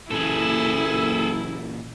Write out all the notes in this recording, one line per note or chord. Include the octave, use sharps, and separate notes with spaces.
F#1 A#2 E3 E4 G#4 A4